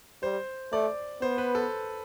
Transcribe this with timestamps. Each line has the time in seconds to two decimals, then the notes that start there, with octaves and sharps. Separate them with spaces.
0.23 G3 C5
0.72 A3 D5
1.21 B3 C5
1.38 B4
1.55 A4